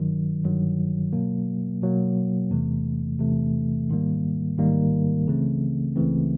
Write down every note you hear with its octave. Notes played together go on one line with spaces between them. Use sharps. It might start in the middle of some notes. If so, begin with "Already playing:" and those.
Already playing: G1 G2 D#3 F#3
G1 G2 D#3 F#3
B2 F#3 A#3
B2 F#3 A#3
E2 C3 E3 A3
E2 C3 E3 A3
A1 G#2 D#3 G3 A#3
A1 G#2 D#3 G3 A#3
C#2 C#3 E3 A3 C4
C#2 C#3 E3 A3 C4